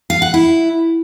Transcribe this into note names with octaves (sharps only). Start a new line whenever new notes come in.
F5
F#5
E4